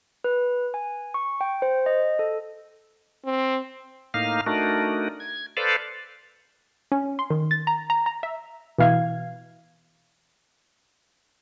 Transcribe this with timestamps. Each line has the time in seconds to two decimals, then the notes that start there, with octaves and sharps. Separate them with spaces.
0.24 B4
0.74 G#5
1.14 C#6
1.41 G5
1.62 C5
1.86 D#5
2.19 A4
3.26 C4
4.14 A2 A#3 D#4 F5 F6
4.46 A3 D4 D#4 F#4 A#4
5.20 G#6
5.57 A4 B4 C5 D5 F5
6.92 C#4
7.19 C6
7.30 D#3
7.51 A6
7.67 A#5
7.90 A#5
8.06 A#5
8.23 E5
8.78 B2 E3 F5 G#6